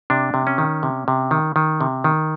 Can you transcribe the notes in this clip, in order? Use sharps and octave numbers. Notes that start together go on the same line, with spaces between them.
C3 D4
C3
C#4
D#3
C3
C3
D#3
D#3
C3
D#3